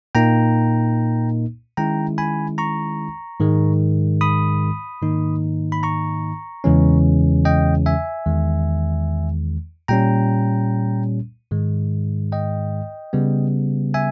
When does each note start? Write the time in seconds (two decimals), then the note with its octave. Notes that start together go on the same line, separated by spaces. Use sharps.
0.15 A#2 A#3 D#4 G5 A#5
1.77 D#3 G#3 C#4 E4 G5 A#5
2.18 G#5 B5
2.58 A#5 C#6
3.40 G#2 D#3 G#3
4.21 B5 D#6
5.02 G#2 D#3 A#3 D#4
5.72 B5
5.83 A#5 C#6
6.64 E2 C#3 E3 G#3 C#4
7.45 D#5 G5
7.86 E5 G#5
8.26 E2 D#3 G#3
9.88 A#2 G3 C#4 G5 A#5
11.51 G#2 D#3 G#3
12.32 D#5 G5
13.13 C#3 G3 B3
13.94 E5 G#5